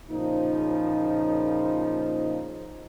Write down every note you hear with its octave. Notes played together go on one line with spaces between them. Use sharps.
A#2 C#3 F3 D#4